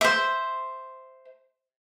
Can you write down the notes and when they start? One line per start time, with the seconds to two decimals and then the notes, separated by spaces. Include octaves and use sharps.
0.01 C5 E5